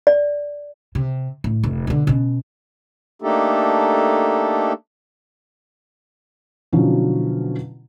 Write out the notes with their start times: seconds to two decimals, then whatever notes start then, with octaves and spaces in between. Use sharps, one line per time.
0.07 D5
0.95 C3
1.44 A2
1.64 F1
1.87 B2 D3
2.07 B2 C#4
3.22 A3 A#3 D4 D#4 G4 A4
6.73 B2 D3 F3 F#3 C#4 E4